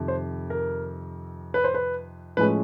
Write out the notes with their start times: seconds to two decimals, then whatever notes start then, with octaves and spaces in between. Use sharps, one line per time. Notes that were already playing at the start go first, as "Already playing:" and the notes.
Already playing: F2 C3 D#3
0.08 C5
0.50 A#4
1.54 B4
1.64 C5
1.74 B4
2.37 A2 F3 G#3 C#4 B4